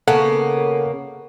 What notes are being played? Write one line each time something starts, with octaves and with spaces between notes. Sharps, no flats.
C#3 A#3 B3 A4 F#5